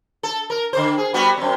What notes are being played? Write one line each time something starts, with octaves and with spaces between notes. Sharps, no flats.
A4
A#4
D3 C5
G#4
G3 B3 F#4
F#2 C4